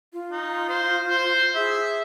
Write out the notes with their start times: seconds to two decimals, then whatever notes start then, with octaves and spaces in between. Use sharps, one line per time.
0.13 F4
0.31 D#4
0.69 C5
1.09 C5
1.55 G#4 E5